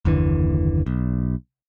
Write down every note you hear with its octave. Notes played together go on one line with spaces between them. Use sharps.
F#1 D#2 D3 E3
B1